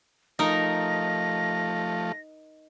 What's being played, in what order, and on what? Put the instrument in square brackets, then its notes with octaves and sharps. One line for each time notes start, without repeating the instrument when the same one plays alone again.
[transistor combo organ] F3 A3 [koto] D#4 A#4 [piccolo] A#6